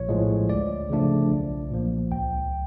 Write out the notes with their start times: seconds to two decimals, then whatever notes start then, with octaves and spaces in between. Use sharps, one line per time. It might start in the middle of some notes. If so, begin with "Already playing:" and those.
Already playing: A#1 C#5
0.09 A2 F3 G#3
0.49 D2 D5
0.90 C#3 F3 A3 D4
1.31 B1
1.70 A#2 F3 A#3
2.11 C#2 G5